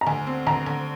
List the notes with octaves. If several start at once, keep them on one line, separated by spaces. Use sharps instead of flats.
A#5
D2 G#5
C4
D2 A#5
D2